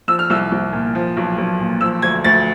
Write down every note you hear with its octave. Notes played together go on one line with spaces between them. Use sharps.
F3 E6
F6
C2 E6
C2
A#2
F3
B1
B1
A#2
F3 E6
D2 G#6
D2 A6